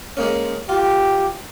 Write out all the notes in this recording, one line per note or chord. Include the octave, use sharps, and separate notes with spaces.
G#3 A#3 C#4
F4 G4